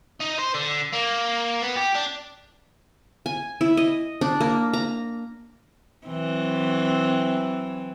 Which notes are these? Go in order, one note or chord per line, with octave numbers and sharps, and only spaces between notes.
D#4
C5
D3
A#3
B3
G4
D4
G#5
E4
D#5
D4
A#3
A#5
E3 F#3 C4